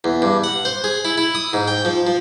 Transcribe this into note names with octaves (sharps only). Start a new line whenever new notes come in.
E2
G2
F#5
C5
G#4
E4
E4
D#6
G#2
G5
F3
F3